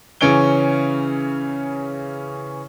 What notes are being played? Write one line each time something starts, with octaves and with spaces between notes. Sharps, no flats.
C#3 E3 C#4 C#5 D7 G7